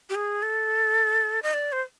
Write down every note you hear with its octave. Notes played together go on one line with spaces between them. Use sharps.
G4
G#4
A4
D#5
D5
C5